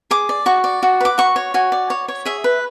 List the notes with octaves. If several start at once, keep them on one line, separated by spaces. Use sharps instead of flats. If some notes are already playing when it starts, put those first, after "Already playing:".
G#4 D6
D5
F#4 C#6
D5
F#4
B4 D6
F#4 C#6
C#5
F#4 G#5
D5
C#5
C#5
G#4 E5
B4